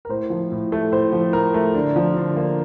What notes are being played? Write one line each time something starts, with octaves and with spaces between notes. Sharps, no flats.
A#4
A2 C5
F3
A2
A3
A2 C5
F3
A2 A#4
A3
D3
F3
D3
A#3